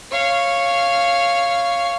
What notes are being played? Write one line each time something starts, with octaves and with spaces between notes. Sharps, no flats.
C#5 F5